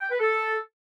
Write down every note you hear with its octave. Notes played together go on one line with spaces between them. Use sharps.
G5
B4
A4